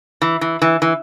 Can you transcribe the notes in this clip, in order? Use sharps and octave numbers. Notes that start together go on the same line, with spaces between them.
E3
E3
E3
E3